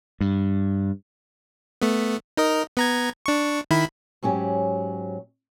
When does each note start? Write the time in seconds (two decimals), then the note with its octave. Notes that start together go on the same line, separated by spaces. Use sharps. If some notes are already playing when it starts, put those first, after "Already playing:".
0.21 G2
1.81 A3 B3
2.37 D#4 A#4 D#5
2.77 B3 A#5 G#6
3.26 D4 C#6
3.71 D#3 E4 B5
4.22 G#2 F#3 C#4 G4